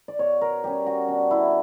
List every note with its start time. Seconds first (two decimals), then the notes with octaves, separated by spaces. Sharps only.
0.08 D5
0.19 B2 C#5
0.41 A#4
0.64 G3 C#4 G4
0.86 F#4
1.08 B2 D4
1.31 E4